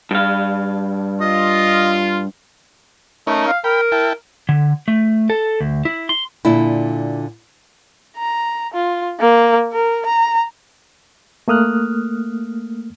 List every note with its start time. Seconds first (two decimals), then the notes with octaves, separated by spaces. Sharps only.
0.11 G2 F5
1.21 F4 D#5
3.27 A3 C#4 D#4 A#4
3.47 F5
3.64 A#4 G5 B5
3.92 E4 G5 A5
4.49 D3
4.88 A3
5.30 A4
5.60 D2
5.85 E4
6.09 C6
6.45 A#2 D3 E4
8.17 A#5
8.74 F4
9.20 A#3
9.72 A#4
10.06 A#5
11.48 A3 A#3 D#6 F6 F#6